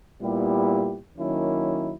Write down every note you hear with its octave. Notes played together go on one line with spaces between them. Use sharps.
A#2 G3 B3 E4 G4
D#3 F#3 A#3 C#4 E4